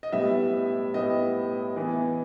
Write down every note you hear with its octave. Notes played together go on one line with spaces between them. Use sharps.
D#5
A2 G3 B3 E5
A2 G3 B3 D#5
E3 B3